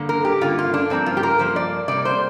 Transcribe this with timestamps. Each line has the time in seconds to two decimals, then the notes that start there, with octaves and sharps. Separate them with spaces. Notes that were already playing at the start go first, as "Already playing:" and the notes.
Already playing: G2 D3 A#3
0.09 A#4
0.25 G4
0.41 G2 D3 A#3 F4
0.59 F4
0.74 D4
0.90 G2 F3 A#3 C4
1.06 F4
1.17 G4
1.23 A#4
1.39 G2 F3 A#3 C5
1.56 D5
1.88 C3 G3 A#3 D5
2.05 C5